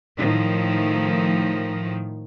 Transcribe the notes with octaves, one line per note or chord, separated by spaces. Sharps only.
A2 D#3 F3